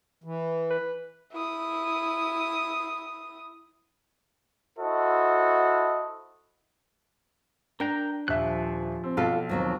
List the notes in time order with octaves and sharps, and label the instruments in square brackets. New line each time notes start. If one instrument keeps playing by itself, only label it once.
[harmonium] E3
[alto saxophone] B4
[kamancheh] E4 D#6
[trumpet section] E4 F#4 A4 C5 D#5
[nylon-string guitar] D4 [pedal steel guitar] A#4 G5 A#5
[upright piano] D#1 E5 [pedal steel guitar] F3 F#6
[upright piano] C4
[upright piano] B1 [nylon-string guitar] F4 A4
[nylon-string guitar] D#2 F#3 C4